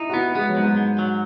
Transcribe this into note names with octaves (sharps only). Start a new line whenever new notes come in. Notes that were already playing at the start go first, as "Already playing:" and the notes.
Already playing: D#4 E4
F#4
B3 E4
G#3 B3
F#3
G#2
G#3
G#2
F#3